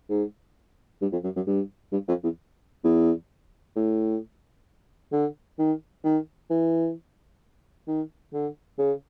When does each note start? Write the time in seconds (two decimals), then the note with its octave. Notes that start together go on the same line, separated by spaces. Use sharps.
0.09 G#2
1.02 G2
1.12 F2
1.24 F#2
1.36 F#2
1.47 G2
1.92 G2
2.08 F2
2.23 E2
2.84 E2
3.76 A2
5.12 D3
5.59 D#3
6.04 D#3
6.50 E3
7.87 D#3
8.33 D3
8.78 C#3